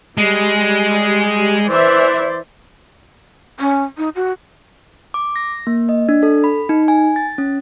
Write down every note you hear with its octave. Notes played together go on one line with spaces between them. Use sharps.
G3 G#3
E3 C5 D5 E5
C#4
D#4
F#4
D6
A#6
A#3
D#5
D4
A4
B5
D#4
G#5
A6
C#4